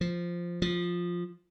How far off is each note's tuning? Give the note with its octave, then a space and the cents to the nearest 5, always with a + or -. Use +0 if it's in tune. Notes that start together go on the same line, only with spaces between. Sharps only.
F3 -5
F3 +5